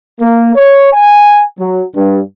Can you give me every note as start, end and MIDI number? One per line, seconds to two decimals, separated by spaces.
0.20 0.54 58
0.55 0.92 73
0.93 1.42 80
1.59 1.84 54
1.96 2.20 43